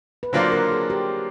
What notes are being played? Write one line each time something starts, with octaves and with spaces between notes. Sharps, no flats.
B4
D3 F#3 A#3 D4 F4 C5
A#4
G#4
G4